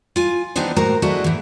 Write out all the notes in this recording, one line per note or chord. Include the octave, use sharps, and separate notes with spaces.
F4 G#5
E3 G3 B3 D4 D#4 C5
A2 G#3 F#4 A#4 C5 A#5
G#3 A3 D4 E4 F#4 G#4
G#2 E3